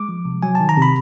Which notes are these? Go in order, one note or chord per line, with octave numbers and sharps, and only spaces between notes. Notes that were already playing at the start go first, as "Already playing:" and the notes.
Already playing: G#3 D6
F3
C3
F#3 G#5
A5
D#3
A#5
C3
B5